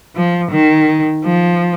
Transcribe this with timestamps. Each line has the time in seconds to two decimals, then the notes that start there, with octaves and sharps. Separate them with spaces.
0.16 F3
0.52 D#3
1.25 F3